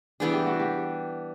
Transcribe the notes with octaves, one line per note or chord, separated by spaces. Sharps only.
E3 G3 B3 D4 G#4
G4
F#4
G4